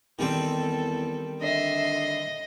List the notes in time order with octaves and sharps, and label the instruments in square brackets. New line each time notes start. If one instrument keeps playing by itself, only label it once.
[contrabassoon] E2 [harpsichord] D#3 G3 C4 [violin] A4
[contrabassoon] D3 [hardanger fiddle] D#5 [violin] E5 C7